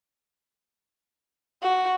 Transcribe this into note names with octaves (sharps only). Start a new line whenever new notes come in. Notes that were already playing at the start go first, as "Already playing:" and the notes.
F#4